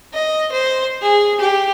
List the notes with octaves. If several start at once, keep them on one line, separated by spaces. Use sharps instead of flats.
D#5
C5
G#4
G4